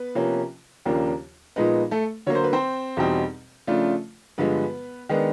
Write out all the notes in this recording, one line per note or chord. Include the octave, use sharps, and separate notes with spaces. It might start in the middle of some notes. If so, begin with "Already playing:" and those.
Already playing: B3 B4
C3 F3 A#3 C#4
D#2 C#3 F3 A#3 D4
A#2 F3 G#3 B3 D#4 B4
A3 A4
D3 F#3 A#3 C#5
C5
B4
C4 C5
E2 B2 G3 C4 D#4
C#3 F3 A3 D4 F4
G2 D3 F3 G#3 B3 B4
D#3 G#3 B3 D4